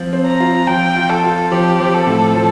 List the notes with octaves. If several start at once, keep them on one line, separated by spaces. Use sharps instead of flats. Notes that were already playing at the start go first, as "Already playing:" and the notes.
Already playing: F3 C4 F4
C4
A#5
F4
F3 G5
F4
A4
F4
F3 G4
F3
A4
A2
F3